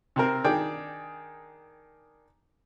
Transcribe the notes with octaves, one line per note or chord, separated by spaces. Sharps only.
C3 C4 A#4
D#3 D4 G#4 D5 G5